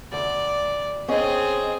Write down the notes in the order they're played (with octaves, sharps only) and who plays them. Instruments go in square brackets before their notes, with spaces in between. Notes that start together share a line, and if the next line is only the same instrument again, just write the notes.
[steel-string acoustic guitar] D2 [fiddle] D5
[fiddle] C4 G#4 [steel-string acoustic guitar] C#4 D#5